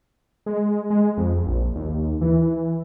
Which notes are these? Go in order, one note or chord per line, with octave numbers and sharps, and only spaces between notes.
G#3
G#3
F2
A#1
D#2
E3